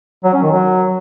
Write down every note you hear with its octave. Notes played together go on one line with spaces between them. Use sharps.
F#3
C#4
D#3
F#3